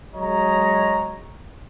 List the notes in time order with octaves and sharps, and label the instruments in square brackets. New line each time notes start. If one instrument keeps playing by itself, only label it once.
[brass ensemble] F#3 G#3 C#5 D#5 A#5